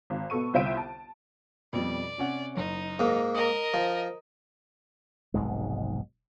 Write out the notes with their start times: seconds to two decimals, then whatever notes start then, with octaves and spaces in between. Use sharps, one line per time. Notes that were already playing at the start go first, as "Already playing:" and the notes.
0.10 G#1
0.30 B2 B3 A4 C#6 D#7
0.53 G1 C2 C5 E5 D7 D#7
0.77 A5
1.73 F2 B2 G3 D5
2.18 C3 C#4 F#5
2.57 F#1 D#4
2.99 G#2 A#3
3.34 A#4 D#5 D#6
3.74 F3
5.34 F1 B1 G#2 G#3